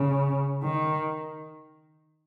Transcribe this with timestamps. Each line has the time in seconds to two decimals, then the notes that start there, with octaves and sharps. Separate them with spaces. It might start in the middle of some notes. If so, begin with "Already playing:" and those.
Already playing: C#3
0.63 D#3